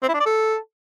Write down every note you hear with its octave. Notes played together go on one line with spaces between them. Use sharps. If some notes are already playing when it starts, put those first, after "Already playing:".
C4
E4
D4
D5
A4